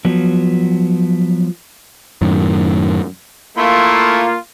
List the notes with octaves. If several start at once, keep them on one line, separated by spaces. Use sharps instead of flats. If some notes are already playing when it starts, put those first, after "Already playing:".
F3 F#3 B3
F#2 A2 D#3
A3 A#3 E4 F4 C6